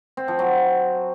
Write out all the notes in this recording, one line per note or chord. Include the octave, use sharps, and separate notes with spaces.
C4
F3
F#3